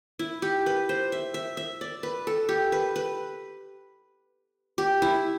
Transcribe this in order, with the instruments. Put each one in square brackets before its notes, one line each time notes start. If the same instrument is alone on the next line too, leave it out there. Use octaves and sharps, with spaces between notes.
[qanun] E4
G4
B4
C5
E5
E5
E5
D5
B4
A4
G4
B4
B4
G4
E4